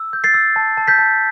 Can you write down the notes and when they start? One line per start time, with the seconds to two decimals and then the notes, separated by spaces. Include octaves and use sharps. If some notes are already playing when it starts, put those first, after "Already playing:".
Already playing: E6
0.13 G6
0.24 A6 C7
0.34 E6
0.56 A5
0.77 A5
0.88 G6 B6
0.99 A5